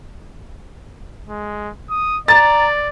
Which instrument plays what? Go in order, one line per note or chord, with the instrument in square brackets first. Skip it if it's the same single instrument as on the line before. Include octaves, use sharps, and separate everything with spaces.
[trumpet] G#3
D#6
[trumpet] D5 [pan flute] A#5 [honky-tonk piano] A6